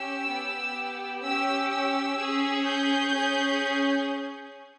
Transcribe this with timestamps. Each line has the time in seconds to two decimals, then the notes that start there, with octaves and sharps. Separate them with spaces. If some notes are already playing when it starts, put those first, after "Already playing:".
Already playing: C#4 G4 E6
0.28 B3 G4
1.22 C#4 G4 E6
1.70 E6
2.17 C#4 G#4
2.64 G6
3.13 C#4 G#4